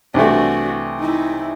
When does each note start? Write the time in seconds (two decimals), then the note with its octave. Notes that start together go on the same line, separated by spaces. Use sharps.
0.14 C2 E3 A3 D4 F#4
1.00 D#4 E4